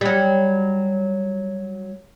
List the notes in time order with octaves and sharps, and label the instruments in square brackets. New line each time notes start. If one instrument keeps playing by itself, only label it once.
[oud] F#3 G3